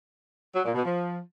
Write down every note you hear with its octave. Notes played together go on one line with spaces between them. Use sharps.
F#3
A#2
B2
F3